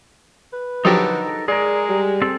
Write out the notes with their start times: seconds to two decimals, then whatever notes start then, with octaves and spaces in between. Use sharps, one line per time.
0.53 B4
0.85 D3 F3 F#3 D#4 G4 A4 A#4
1.48 G#3 G#4 A#4 D5
1.89 G3
2.22 C4 A4